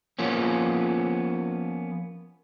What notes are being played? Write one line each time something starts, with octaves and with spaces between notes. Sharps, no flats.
F3 A#3 B3 C#4